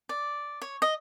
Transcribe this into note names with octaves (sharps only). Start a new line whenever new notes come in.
D5
C#5
D#5